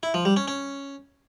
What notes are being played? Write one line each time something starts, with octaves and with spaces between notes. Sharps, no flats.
E4
F3
G3
C#4
C#4